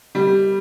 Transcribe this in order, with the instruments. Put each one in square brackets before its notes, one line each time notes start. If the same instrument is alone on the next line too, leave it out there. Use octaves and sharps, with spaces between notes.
[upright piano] G3